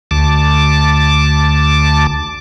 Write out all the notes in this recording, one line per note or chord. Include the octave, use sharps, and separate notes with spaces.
D2 A5 D6